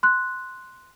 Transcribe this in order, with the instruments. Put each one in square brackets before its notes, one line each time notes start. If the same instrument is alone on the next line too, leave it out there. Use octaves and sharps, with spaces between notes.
[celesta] C6 F#6